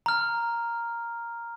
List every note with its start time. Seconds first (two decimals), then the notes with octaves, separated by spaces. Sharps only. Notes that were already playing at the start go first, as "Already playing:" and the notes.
0.06 A#5 F6